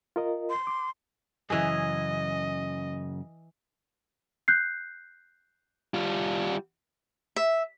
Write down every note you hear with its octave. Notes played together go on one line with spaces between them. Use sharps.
F4 A#4 D#5
C6
D6
F#2 C#3 E3 G#4 D#5
F#6 G6 C7
G3 F4
E5